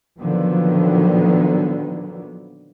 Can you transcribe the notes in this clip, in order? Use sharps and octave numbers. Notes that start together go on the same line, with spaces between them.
A#2 D3 D#3 F3 F#3 B3